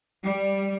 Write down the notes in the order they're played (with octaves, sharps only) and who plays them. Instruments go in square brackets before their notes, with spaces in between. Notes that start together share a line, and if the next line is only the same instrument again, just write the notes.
[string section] G3